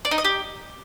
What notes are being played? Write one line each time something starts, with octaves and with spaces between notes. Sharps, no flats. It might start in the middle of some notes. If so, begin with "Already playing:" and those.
D5
D#4
D#5
G4